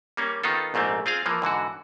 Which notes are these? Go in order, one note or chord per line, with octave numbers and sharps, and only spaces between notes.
G3 A#3 C#4
D#3 B3 D#4 F4 A4
A#1 G#2 A3 A#3 C4
C4 F4 G#4 F5
E3 F3 A#3
G#2 D3 E3 F#4